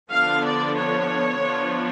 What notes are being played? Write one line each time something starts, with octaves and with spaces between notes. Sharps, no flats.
D3 F3 B3 D4 F5
D5
C#5
F3 B3 D4